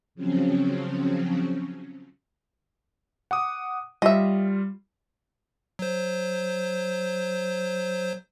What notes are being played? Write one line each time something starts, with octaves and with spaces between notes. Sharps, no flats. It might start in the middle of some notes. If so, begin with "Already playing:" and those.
C#3 F3 F#3 C4 C#4
F#5 D6 D#6
G3 F4 D#5 E5
F#3 C5